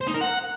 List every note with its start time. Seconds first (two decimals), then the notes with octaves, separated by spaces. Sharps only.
0.01 C5
0.07 D#4
0.14 A#4
0.21 F#5